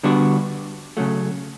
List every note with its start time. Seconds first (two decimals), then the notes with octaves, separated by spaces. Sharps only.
0.03 D3 G3 B3 D4 F#4
0.97 C#3 F#3 A3